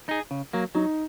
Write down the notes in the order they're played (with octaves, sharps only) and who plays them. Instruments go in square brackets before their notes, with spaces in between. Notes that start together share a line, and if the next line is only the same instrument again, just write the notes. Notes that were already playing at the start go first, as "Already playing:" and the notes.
[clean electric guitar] D#4 G#4
C#3
F#3 A#3
[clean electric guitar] F#3 [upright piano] D#4